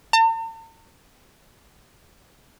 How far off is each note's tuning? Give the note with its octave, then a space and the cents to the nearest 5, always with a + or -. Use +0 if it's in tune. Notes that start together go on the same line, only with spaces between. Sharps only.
A5 +45